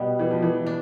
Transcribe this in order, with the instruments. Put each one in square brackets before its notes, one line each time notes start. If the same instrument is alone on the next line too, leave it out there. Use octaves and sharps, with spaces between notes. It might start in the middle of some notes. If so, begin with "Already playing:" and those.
Already playing: [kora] B2 G3 B3
[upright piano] E3
F3
E3
[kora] D4